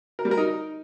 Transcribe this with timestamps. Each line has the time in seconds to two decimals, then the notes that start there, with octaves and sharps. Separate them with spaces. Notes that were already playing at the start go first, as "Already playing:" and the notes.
0.19 A#4
0.25 G3
0.31 A#4
0.38 D#4